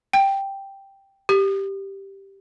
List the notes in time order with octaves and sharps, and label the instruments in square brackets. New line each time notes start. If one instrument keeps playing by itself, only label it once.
[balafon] G5
G4